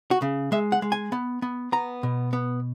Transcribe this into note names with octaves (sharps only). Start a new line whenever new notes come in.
F#4
C#3
G#3 E5
F#5
G#3
G#5
B3
B3
B3 A#5
B2
B3